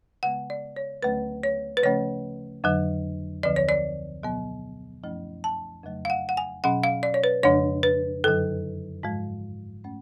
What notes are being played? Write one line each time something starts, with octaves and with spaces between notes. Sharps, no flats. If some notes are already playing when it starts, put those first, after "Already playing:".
C#3 G#3 B3 F#5
D5
C#5
D2 D3 F#3 A3 C#4 B4
C#5
B4
C#3 F3 A3 C#4 C#5
F2 D3 F#3
D2 D3 F3 D5
C#5
D5
B2 F#3 B3
F#2 F3 A3 C#4
A5
F2 C#3 F#3 A3
F5
F#5
F#5
G#5
B2 F#3 C#4 F#5
F5
D5
C#5
B4
F2 C#3 F3 G#3 D4 C#5
B4
F#2 D3 F#3 A4
G#2 F3 G#3
A3 C#4